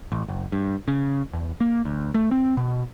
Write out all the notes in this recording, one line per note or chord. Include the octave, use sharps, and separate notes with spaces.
A1
F#1
G2
C#3
E2
A#3
D2
A3
C4
B2